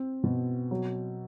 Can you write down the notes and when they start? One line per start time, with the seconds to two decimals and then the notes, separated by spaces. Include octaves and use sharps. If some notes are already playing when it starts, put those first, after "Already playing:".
Already playing: C4
0.24 B2
0.71 F#3